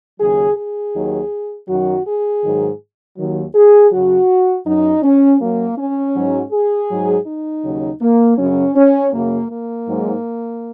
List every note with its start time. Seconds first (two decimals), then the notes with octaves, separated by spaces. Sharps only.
0.20 D#2 C#3 F#3 G#4
0.57 G#4
0.95 D#2 D#3 F#3
1.69 F#2 D#3 F#3 F#4
2.07 G#4
2.43 G#2 D#3 F#3
3.18 D#2 D#3 F#3
3.55 G#4
3.91 F#2 C#3 F#3 F#4
4.66 F#2 F#3 D#4
5.03 C#4
5.41 F#2 F#3 A#3
5.78 C#4
6.15 G#2 F#3
6.52 G#4
6.90 G#2 F#3
7.26 D#4
7.64 D#2 C#3 F#3
8.01 A#3
8.38 F#2 C#3 F#3 C#4
8.76 C#4
9.13 F#2 C#3 F#3 A#3
9.50 A#3
9.87 G#2 F#3